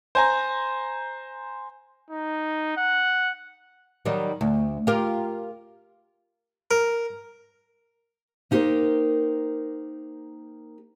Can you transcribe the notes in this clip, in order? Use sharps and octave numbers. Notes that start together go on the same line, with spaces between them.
C5 G#5 A#5
D#4
F#5
D#3 F#3 G3
D2
F4 G4 A#4
A#4
A#3 D#4 G4 A#4 C5